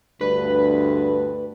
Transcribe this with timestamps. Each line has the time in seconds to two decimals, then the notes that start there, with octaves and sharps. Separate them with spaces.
0.21 D2 G2 B4